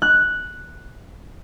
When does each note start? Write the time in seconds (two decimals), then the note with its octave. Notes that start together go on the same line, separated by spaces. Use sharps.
0.02 F#6